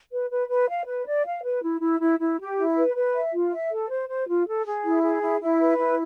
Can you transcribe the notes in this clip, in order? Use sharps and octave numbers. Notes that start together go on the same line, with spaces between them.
B4
B4
B4
F5
B4
D5
F5
B4
E4
E4
E4
E4
G4
E4
B4
B4
E5
F4
E5
A4
C5
C5
F4
A4
G#4
E4
G#4
E4
E4
B4
E4